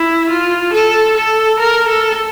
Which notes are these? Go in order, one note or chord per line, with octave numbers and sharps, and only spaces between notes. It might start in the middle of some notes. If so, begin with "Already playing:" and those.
Already playing: E4
F4
A4
A4
A#4
A4